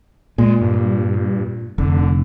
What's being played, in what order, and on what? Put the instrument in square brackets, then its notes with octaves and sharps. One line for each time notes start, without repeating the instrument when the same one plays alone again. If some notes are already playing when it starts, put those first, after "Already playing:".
[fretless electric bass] A#2 [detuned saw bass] G#3
[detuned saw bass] G2
[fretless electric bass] F1 [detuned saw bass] D3